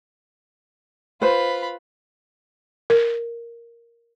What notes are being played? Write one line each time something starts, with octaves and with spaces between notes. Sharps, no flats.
F4 B4 C5 B5
A#4